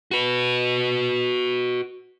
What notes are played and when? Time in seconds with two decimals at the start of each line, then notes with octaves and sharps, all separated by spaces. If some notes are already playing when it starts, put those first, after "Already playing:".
0.11 F#4 B4